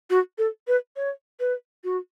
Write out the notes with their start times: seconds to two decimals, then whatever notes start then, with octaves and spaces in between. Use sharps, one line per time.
0.10 F#4
0.38 A4
0.68 B4
0.96 C#5
1.40 B4
1.84 F#4